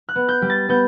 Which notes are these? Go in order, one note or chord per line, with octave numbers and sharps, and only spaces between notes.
F#6
B3
G6
G3
A6
B3 G6